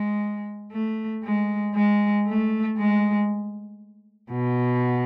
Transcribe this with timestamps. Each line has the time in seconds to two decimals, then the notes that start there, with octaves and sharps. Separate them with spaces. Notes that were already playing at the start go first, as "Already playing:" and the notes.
Already playing: G#3
0.72 A3
1.24 G#3
1.75 G#3
2.27 A3
2.78 G#3
4.32 B2